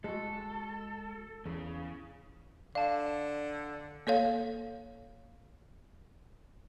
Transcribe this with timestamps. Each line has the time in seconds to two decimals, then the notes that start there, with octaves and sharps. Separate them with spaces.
0.04 G#3 F#4 A4
1.46 E2 C#3
2.75 D3 D5 F5 A5
4.07 A#3 A4 C#5 F5